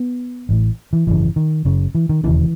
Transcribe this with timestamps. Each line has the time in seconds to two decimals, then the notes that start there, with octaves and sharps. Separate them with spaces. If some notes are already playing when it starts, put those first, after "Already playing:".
Already playing: B3
0.49 A1 A2
0.93 E3
1.07 G#1 F#2 C#3 E3
1.36 D#3
1.65 F#1 F#2 C#3
1.95 E3
2.09 D#3
2.24 E1 D#2 C#3 E3